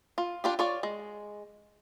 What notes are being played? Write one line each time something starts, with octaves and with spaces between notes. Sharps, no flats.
F4
D4 F4 G4
F4 C#5 D5
G#3